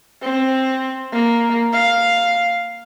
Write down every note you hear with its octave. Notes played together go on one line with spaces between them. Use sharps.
C4
A#3
F5